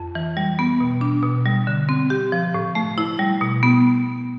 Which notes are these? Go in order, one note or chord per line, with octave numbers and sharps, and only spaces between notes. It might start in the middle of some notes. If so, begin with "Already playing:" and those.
Already playing: F2
E3
G3
B3
B2
D4
B2
G3
D3
C4
G4
F3
A2
A3
E4
G3
B2
B3